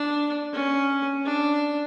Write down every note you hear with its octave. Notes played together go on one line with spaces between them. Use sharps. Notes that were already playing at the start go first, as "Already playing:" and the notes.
Already playing: D4
C#4
D4